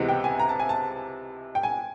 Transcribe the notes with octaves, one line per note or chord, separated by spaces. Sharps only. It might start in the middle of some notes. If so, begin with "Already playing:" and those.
Already playing: C#2 C3 E3 G#3 B3
G5
G#5
A#5
A5
G#5
A5
G5
G#5